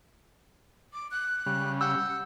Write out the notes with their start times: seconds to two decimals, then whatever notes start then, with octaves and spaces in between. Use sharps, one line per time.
0.93 D6
1.11 F#6
1.46 C#3 G3
1.81 F#5 E6 G6